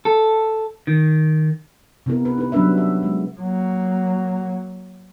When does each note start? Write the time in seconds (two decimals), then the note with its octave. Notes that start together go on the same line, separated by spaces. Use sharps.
0.05 A4
0.87 D#3
2.06 C3 B3 E4 A#4
2.25 B4
2.38 D#4 B4
2.52 F#3 G3 C#4 D4 B4 E5
2.78 E5
3.03 G#3
3.40 F#3 A#3